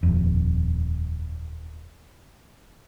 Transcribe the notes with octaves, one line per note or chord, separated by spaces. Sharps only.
D#1 F2